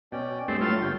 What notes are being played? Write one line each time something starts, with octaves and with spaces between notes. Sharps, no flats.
B2 C#4 D5 G5
G2 A3 C4 D#5
A2 F#3 A3 F4 C6
G1 G2 D4 C#5 G5